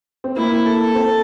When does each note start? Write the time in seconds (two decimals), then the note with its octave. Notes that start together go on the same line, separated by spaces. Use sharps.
0.24 C4
0.36 A#3 E4
0.65 A4
0.95 C4